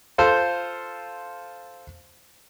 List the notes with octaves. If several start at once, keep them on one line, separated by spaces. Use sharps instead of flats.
F4 A4 C5